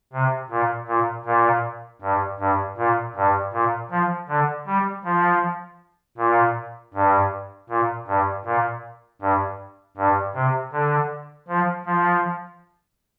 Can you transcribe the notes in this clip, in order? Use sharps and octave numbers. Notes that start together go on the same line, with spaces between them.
C3
A#2
A#2
A#2
G2
G2
A#2
G2
A#2
F3
D3
G3
F3
A#2
G2
A#2
G2
A#2
G2
G2
C3
D3
F3
F3